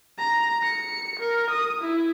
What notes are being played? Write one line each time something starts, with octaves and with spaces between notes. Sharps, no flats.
A#5
C#7
A#4
D#6
E4